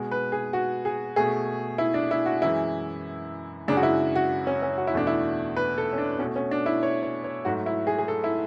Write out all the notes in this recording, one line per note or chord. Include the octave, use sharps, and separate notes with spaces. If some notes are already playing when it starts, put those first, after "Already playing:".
Already playing: B2 G#3
B4
G#4
F#4
G#4
B2 A3 G#4
E4
D4
E4
F#4
F#2 E3 G#3 E4
F#2 C#3 G#3 D4
F#4
E4
F#4
C#4
C#4
F#4
E4
E2 B2 A3 D4
E4
B4
A4
C#4
D4
B2 C#4
A3
C#4
D4
E4
C#5
C#5
C#5
G#2 F#3 A3 F#4
E4
G#4
G#4
A4
E4